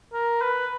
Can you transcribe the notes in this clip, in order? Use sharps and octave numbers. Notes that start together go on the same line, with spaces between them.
A#4
B4